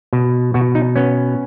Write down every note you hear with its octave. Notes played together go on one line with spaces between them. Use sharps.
B2
B2 F#4
D#4
B3 C#4